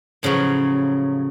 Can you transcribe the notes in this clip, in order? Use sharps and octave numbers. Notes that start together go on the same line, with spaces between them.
A2 C#3 F3 F#3